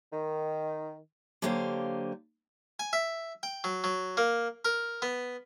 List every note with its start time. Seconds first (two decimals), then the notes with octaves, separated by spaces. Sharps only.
0.12 D#3
1.42 D3 F#3 A#3 G4 C5 F5
2.79 G#5
2.93 E5
3.43 G5
3.64 F#3
3.84 F#3
4.17 A#3
4.65 A#4
5.02 B3